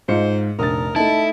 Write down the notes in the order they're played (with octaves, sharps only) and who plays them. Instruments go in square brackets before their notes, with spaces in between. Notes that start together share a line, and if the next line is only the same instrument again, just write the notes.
[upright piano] G#2 C#7 [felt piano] D#4 F4 [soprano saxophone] C5
[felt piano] F1 A#1 A6 [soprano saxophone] A#4 [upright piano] D#6
[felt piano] A3 D#4 [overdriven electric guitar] E4 [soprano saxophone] A5